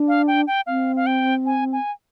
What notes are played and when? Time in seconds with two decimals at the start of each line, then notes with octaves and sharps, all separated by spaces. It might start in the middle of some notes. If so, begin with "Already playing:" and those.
Already playing: D4
0.08 F5
0.27 G5
0.47 G5
0.67 C4 F5
0.96 F5
1.06 G5
1.46 G#5
1.73 G#5